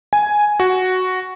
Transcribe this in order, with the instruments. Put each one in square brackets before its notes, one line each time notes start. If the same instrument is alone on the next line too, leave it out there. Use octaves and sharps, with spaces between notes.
[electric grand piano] G#5
F#4